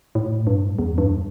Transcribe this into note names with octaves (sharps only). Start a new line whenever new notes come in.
A2
G2
E2
G2